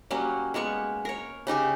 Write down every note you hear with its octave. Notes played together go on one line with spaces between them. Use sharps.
F#3 G3 A#3 C#4
G#3 A#3 B3 C#6
A#4 C#5
C#3 D#4 G4 G#5